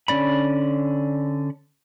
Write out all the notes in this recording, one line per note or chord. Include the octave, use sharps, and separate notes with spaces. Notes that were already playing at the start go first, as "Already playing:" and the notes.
D3 C#4 D5 B5